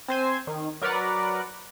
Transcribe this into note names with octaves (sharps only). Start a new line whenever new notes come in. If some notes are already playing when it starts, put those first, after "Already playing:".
C4 C5 G#5
D#3
F#3 A#4 B4 D5 F#5